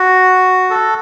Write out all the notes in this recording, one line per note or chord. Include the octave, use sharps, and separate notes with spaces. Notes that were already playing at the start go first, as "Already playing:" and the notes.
Already playing: F#4
A4